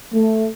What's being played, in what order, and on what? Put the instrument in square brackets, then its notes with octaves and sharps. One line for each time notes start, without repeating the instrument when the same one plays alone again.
[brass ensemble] A3